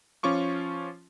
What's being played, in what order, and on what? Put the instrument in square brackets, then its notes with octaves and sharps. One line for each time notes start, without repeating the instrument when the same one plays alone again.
[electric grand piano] F3 C#4 F4 C#6 D6